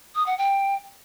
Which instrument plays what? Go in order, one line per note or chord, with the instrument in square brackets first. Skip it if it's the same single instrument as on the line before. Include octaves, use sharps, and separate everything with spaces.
[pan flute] D#6
F#5
G5